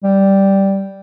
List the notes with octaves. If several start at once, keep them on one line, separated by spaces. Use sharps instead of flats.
G3